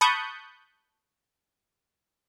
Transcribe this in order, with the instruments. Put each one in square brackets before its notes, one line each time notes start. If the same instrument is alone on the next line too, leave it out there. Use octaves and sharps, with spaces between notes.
[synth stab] A5 B5 C#6 D#6 F#6 G6